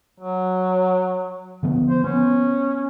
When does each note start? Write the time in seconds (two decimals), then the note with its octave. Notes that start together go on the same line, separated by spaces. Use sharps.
0.20 F#3
1.63 D3 F3 B3
1.89 C5
2.04 B3 C#4